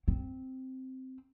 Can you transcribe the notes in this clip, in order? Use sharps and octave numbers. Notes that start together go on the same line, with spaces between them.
C4